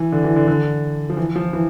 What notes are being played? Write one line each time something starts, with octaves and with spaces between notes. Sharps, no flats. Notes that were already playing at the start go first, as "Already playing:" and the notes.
Already playing: E3
D3
E3
D3
D3
F3
E3
F3
E3